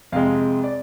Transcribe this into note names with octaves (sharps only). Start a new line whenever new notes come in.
F2 C3 G#3 F5
D5